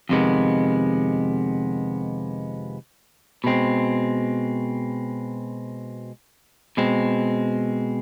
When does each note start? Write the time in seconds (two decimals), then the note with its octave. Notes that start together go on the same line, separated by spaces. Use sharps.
0.09 F2 C3 D#3 G#3 B3
3.44 B2 G#3 C4
6.77 B2 G#3 C4